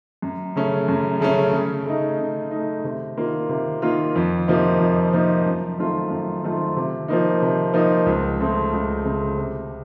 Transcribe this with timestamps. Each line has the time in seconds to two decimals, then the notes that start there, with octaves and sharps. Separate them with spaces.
0.22 F#2
0.56 C#3 A3 C#4
0.88 F#2
1.20 C#3 A3 C#4
1.53 C#3
1.86 A3 D#4
2.19 C#3
2.51 D#4
2.56 A3
2.84 C3
3.17 D#3 A#3 F4
3.49 C3
3.82 D#3 A#3 F4
4.15 F2
4.47 C3 F3 A#3 D#4
4.80 F2
5.13 C3 F3 A#3 D#4
5.45 F#2
5.78 D#3 A3 C4 F4
6.10 F#2
6.43 D#3 A3 C4 F4
6.77 C3
7.08 F3 A#3 D#4
7.42 C3
7.74 F3 A#3 D#4
8.06 C#2
8.39 C#3 A3 C4
8.73 C#2
9.05 C#3 A3 C4
9.38 C3